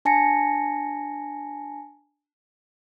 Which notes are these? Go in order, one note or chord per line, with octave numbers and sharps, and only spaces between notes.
D4 G#5 A5 A#6 C#7